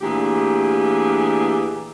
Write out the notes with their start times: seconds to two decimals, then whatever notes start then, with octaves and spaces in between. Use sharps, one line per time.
0.02 D2 A#2 E3 G4 G#4